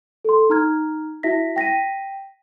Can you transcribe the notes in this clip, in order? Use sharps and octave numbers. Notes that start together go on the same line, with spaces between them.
A4 C6
D#4 A#5 F6 G#6
E4 F#4 E5 A#6 B6
G5 A#6 B6 D#7